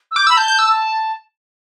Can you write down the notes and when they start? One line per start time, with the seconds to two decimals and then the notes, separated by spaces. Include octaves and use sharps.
0.11 E6
0.16 D6 G6
0.27 E6
0.30 B5
0.37 A5 G6
0.48 G6
0.59 E6